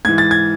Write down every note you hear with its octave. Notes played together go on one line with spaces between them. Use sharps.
G#2 E3 G#6
A6
G#6